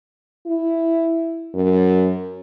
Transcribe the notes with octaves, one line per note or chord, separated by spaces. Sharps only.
E4
F#2